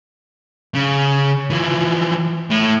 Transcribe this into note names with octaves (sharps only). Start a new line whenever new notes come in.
C#3
E3 F3
A2